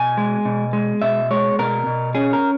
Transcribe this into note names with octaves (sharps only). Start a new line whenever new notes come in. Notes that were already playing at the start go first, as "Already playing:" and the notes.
Already playing: B2 G#5
G#3
B2
G#3
B2 E5
G#3 C#5
B2 A#4
B2
C#4 G#4
A#4